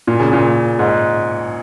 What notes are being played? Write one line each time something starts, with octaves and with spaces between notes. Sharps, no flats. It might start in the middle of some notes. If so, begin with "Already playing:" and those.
A#2
C#3
A#2
G#2